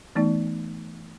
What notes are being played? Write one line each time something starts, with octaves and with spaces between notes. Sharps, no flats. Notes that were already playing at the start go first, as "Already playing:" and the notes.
E3 A3 B3 D#4 D5